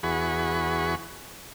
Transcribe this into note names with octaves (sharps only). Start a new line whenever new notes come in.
E2 F#4 G#4 B5 C#6